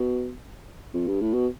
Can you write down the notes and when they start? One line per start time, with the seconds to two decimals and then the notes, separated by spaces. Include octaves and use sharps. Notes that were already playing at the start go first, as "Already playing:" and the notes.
Already playing: B2
0.94 F2
1.07 G2
1.21 A2
1.34 B2